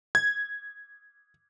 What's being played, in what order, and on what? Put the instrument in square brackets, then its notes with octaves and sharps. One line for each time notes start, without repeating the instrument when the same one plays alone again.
[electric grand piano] G#6